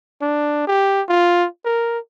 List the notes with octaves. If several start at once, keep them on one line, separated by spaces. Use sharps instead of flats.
D4
G4
F4
A#4